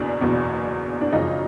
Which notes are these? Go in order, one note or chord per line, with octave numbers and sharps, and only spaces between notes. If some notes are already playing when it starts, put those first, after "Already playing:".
Already playing: F#1 E2 B2 D4
F#1 E2 B2
D4
G#1 F#2 C#3 F3 D#4